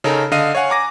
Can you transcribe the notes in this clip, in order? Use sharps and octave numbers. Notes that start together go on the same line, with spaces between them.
C#3 C#4 D#4 A4 A#4
D3 D#5 F5 D#7
C#5 F5 F#5 G#5
G#5 A#5 D6 A#6